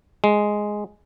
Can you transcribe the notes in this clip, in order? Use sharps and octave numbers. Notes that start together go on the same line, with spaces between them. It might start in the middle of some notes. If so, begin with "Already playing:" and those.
G#3